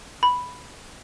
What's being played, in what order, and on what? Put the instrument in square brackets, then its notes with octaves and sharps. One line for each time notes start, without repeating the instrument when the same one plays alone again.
[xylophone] B5